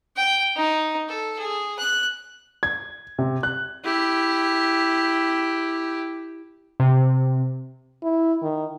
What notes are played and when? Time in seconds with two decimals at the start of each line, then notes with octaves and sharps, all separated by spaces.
0.16 G5
0.56 D#4
1.09 A4
1.39 G#4
1.79 F#6
2.63 G#6
3.19 C3
3.43 F#6
3.84 E4 G4
6.80 C3
8.03 E4
8.42 D#3